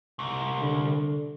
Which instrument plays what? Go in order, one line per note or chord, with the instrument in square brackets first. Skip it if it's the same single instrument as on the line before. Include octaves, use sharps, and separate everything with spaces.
[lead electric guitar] C2
[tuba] D3